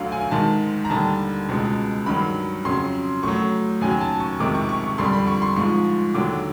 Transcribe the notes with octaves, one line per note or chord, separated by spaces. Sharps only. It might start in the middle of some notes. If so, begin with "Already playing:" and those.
Already playing: D2 D3 F#3 F5
G#5
G#2 D#3 G#3 A5
A#5
D#2 D3 G3 A5
C#2 B2 G#3
G2 D#3 F#3 B5
F2 C#3 F#3 C6
A2 F#3 C#6
D#2 C#3 F#3 G#5
A5
C#6
F2 C3 D#3 G#3 D6
C#6
C#6
C#6
F2 D3 G3 C6
B5
C#6
C6
G#2 F3 G#3 C#6
D#2 D3 F#3 D6